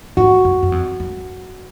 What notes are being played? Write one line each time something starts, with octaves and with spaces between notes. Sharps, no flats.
G#2 F#4
F#2
F#2
F2
F#2